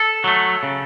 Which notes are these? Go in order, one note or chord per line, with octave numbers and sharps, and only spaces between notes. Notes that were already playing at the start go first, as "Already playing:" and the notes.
Already playing: A4
F#3 A3
C#3